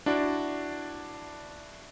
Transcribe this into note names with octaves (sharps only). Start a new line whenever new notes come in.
D4 E4 F#4 D5